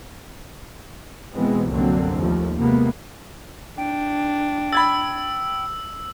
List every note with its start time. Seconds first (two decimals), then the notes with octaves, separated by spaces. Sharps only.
1.35 B2 E3 G#3 B3 C4
1.70 C2 F#2 D3 F#3 A#3 C4
2.15 D#2 F3 A3
2.58 C3 G#3 A#3 B3
3.78 D4 G5
4.72 B5 E6 G#6 A6